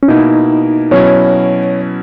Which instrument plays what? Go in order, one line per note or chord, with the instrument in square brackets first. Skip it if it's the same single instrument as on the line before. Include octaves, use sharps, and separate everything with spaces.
[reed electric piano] C#4
[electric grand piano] B2 A#3 E4 [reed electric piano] D#4
[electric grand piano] B2 F#3 C#4 E4 [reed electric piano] C#5